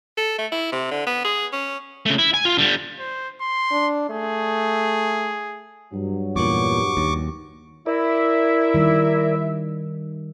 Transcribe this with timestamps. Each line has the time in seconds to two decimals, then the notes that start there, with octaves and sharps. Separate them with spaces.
0.18 A4
0.39 A3
0.52 E4
0.72 C3
0.91 D3
1.07 B3
1.25 G#4
1.53 C#4
2.06 C#3 A3
2.19 E4
2.34 G#5
2.45 F4
2.58 D3 G3
2.99 C5
3.41 C6
3.71 D4
4.10 A3 G#4
5.93 G2 F#3
6.36 E2 A#2 C#6 D6
6.97 D#2
7.86 E4 A#4 D5 E5
8.74 D#3 G3